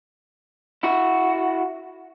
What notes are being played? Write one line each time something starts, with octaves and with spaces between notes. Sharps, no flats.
E4 F#4